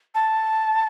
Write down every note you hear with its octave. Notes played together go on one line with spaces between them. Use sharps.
A5